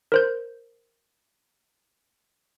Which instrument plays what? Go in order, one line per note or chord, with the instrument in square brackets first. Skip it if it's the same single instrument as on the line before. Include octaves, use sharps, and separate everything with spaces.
[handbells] A#4 C5 G6